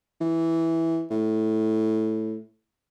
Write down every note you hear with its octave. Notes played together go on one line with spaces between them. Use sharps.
E3
A2